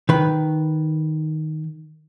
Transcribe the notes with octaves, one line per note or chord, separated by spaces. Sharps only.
D#3 B4